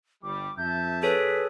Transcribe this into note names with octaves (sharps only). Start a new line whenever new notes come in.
G1 G3 D6
F2 E5 A5 G6
G#4 A4 B4 C#5 B6